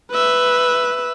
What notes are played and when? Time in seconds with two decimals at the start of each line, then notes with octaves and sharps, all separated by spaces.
0.11 B4 E5